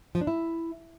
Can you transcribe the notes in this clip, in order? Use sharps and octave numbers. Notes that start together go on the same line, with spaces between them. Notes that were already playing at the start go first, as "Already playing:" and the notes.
F3
D4
E4